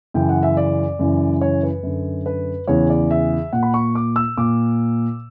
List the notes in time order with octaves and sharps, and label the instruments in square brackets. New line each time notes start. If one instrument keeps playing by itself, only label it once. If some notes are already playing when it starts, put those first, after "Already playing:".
[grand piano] F#2 C#3 E3 G5
F#5
E5
D5
F#2 C#3 E3
C#5
B4
F#2 D3
B4
E2 C#3 E3 C#5
D5
E5
A#2 F#5
B5
C#6
D6
E6
A#2 D6